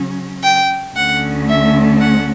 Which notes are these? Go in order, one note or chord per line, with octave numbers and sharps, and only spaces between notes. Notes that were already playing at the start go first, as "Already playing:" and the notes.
Already playing: C#3 F#3 C#4
G5
D2 D3 A3 C#4 F#5
E5
F#5